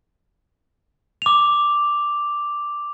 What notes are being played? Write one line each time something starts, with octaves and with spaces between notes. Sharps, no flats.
D6 F7